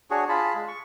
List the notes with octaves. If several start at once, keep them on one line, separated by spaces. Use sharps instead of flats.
D4 F#4 G#4 C#5
F4 G#4 A5 B5
G#3
C#6